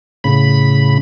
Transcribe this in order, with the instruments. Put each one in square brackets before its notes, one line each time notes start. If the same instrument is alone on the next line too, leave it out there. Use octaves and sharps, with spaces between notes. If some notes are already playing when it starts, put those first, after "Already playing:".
[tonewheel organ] A2 C#3 B5